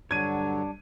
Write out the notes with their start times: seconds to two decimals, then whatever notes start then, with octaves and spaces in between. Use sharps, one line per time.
0.11 G2 D3 F#3 D4 C#5 G#6 D#7